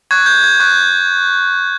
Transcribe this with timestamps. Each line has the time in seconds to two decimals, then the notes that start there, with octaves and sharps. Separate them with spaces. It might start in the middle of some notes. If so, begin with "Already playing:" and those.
0.11 C#6 F#6 G#6
0.26 G6
0.44 G#6
0.60 C#6 F#6